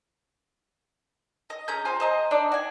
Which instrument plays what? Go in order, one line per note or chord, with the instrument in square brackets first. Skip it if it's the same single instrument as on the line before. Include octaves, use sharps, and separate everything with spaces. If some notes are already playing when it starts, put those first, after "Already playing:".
[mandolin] D#5
C#4 G#4 A#5 G6
F4 C5 G#5
C5 D#5 A5 A#5
D4 D#4 D5
F#4 G#5